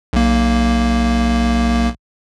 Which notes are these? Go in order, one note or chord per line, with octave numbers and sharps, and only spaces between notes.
B1 A#3